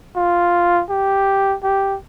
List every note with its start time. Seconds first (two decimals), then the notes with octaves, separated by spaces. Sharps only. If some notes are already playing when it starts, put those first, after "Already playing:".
0.16 F4
0.90 G4
1.63 G4